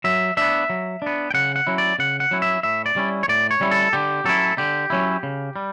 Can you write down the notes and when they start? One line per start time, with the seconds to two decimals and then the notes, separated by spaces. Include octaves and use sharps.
0.04 F#3 E5
0.37 B3 D4 E5
0.70 F#3
1.02 B3 D4
1.31 G5
1.34 C#3 F#5
1.56 F#5
1.67 F#3 C#4 E4
1.78 D5
1.99 C#3 F#5
2.20 F#5
2.31 F#3 C#4 E4
2.42 E5
2.63 A2 E5
2.86 D5
2.96 G3 C#4 E4
3.23 C#5
3.28 A2 D5
3.51 C#5
3.61 G3 C#4 E4
3.71 A4
3.93 D3 G4
4.25 F#3 C#4 E4 A4
4.58 D3 G4
4.90 F#3 C#4 E4
5.23 C#3
5.56 G3